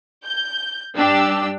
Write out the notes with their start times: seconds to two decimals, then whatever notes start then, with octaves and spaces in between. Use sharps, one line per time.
0.25 G6
0.97 G2 D4 G4 E6